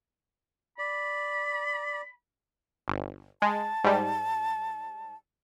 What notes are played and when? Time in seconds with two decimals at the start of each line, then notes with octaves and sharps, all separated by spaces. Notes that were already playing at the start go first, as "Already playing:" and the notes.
0.78 D5 B5
2.88 G1
3.42 G#3 A5
3.84 G#2 G3